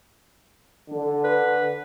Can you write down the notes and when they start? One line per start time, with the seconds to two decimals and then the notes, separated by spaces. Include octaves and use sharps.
0.90 D3
1.24 B4